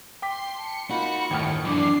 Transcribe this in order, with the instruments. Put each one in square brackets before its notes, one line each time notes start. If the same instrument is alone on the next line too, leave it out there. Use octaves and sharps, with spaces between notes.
[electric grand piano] G5 D6 B6 [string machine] C6 C7
[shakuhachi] A5 [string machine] C#7
[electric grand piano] A#3 D#4 F4 [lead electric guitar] F#4 [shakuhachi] B5
[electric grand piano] G1 A2 F6 [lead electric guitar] D#2 [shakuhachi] G5
[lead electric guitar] F#2 E3 [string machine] D4 C7 [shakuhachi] D6